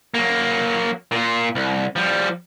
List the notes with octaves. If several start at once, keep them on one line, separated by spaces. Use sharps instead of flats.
F#3 A#3
A#2 F4
C2
F3 G3